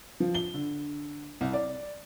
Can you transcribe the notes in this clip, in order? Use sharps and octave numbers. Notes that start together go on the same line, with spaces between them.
F3
G7
D3
C2
D5